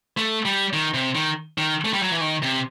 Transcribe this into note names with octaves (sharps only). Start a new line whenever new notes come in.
A3
G3
D#3
C3
D#3
D#3
A3
G3
F#3
E3
D#3
C3